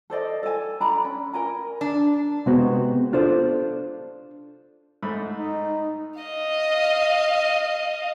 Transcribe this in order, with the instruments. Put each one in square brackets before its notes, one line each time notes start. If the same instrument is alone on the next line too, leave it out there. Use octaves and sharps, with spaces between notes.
[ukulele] A4 C5 D5 D#5
A4 G#5
D4 A#5 B5
C#4
A#4 G#5 A#5
[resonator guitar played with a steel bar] D4
[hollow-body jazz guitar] C3 G#3 B3 F#4 C5
D4 F4 A4 C5 D5
[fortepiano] G#2 A3 B5
[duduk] D#4
[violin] D#5 F5